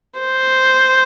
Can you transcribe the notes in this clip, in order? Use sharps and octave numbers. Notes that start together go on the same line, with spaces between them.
C5